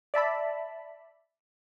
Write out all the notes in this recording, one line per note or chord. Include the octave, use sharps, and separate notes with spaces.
D5 E5 A5 B5